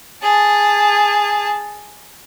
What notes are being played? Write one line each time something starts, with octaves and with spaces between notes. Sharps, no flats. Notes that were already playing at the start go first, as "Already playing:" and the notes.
G#4 A5